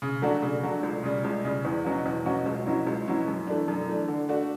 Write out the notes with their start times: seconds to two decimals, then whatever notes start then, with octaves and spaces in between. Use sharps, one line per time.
0.02 C#3
0.22 F#3 A3 D4 F#4
0.42 C#3
0.63 F#3 A3 D4 F#4
0.83 C#2
1.03 C#3 G3
1.24 C#2
1.45 C#3 G3
1.65 E2
1.84 B2 F#3 C#4 F#4
2.06 E2
2.26 B2 F#3 C#4 F#4
2.46 C#2
2.66 B2 F#3 C#4 E4
2.87 C#2
3.08 B2 F#3 C#4 E4
3.28 F#2
3.47 E3 A3 D4
3.68 F#2
3.89 E3 A3 D4
4.08 D3
4.29 A3 D4 F#4